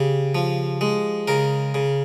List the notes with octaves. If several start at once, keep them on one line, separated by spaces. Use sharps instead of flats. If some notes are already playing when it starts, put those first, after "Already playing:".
Already playing: C#3 G4
F3
G#3
C#3 A#4
C#3